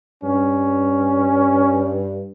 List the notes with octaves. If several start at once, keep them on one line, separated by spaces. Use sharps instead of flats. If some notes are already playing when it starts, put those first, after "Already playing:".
G2 C#4